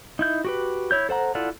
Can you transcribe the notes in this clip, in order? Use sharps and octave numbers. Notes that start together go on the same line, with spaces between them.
D#4 E4 G6
F#4 G4 B4
E4 C#5 G6
A4 C5 F#5 A#5
E4 F4 A4 D5 F#5